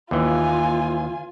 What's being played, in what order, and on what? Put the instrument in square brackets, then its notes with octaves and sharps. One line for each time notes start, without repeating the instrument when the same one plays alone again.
[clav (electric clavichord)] D#2 E3 [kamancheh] F4 G#5